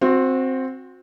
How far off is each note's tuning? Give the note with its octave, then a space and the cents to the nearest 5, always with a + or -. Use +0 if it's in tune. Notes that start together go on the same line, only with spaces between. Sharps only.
C4 +5 F#4 -25